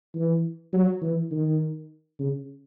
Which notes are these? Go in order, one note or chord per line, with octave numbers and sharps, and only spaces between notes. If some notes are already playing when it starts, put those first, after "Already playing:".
E3
F#3
E3
D#3
C#3